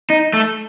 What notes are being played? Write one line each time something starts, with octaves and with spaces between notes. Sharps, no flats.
D#4
A3